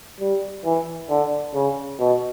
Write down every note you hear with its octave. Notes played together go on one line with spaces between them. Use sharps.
G3
E3
D3
C#3
B2